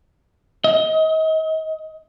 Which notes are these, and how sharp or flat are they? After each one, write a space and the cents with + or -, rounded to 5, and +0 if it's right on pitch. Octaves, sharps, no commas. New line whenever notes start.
D#5 +30